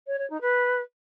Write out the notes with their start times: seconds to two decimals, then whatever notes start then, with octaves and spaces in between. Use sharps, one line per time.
0.07 C#5
0.19 C#5
0.30 D#4
0.41 B4